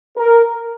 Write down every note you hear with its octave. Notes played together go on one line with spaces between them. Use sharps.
A#4